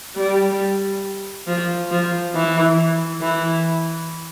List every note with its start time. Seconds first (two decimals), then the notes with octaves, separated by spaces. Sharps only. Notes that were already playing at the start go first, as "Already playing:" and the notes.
0.16 G3
1.47 F3
1.92 F3
2.35 E3
3.22 E3